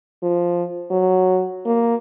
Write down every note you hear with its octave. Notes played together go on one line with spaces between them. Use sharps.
F3
F#3
A#3